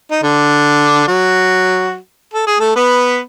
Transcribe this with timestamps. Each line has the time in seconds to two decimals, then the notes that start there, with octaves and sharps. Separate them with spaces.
0.11 D#4
0.23 D3 D4
1.07 F#3 F#4
2.33 A4
2.47 G#4
2.59 A3 A4
2.76 B3 B4